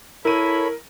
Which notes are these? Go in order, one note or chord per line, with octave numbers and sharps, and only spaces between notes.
E4 A4 A#4 C#5 B5 D#7